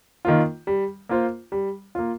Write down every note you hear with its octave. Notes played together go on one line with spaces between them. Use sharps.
D#3 A#3 F4
G3
A#3 F4 C5
G3
A#3 F4